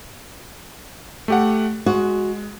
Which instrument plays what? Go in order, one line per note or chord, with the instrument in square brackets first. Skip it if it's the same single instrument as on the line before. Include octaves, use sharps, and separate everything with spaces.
[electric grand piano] A3 G4 F#5
[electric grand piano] G#3 [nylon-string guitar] F#4